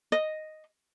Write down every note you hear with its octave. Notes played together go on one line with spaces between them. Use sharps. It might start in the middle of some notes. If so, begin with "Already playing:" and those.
D#5